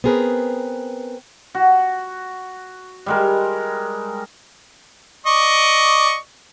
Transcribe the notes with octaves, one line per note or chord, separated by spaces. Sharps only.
B3 C4 G#4 A#4 B4
F#4
G3 G#3 A#4
D5 D#5 C#6